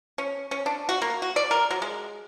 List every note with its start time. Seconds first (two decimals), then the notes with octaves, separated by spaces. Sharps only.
0.18 C#4
0.51 C#4
0.66 D4
0.89 F#4
1.02 A#3
1.22 F#4
1.36 D5
1.51 A#4
1.71 F#3
1.82 G#3